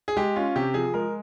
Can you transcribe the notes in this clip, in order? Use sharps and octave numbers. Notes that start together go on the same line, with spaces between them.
G#4
G#3 G4
C#4 F4
C3 G4
F3 G#4
G#3 A#4